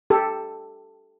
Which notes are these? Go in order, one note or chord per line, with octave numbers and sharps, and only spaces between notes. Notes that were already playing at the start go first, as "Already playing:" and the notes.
G4 A4